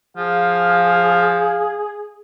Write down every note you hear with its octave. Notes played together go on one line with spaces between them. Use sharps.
F3 G#4 F5